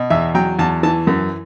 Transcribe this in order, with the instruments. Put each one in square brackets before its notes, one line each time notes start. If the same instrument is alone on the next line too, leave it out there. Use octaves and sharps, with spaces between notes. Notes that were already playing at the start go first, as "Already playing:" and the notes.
Already playing: [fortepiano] B2
E2 E5
F#3 G5
E2 A5
E3 A5
F#2